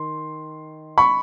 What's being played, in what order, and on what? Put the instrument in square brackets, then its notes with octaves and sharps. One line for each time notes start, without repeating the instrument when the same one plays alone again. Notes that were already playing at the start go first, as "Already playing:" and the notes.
Already playing: [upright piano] D#3 C6
B5 C#6